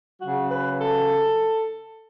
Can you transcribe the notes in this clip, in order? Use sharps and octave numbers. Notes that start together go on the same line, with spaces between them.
C#3 F#3 F#4
B4
A4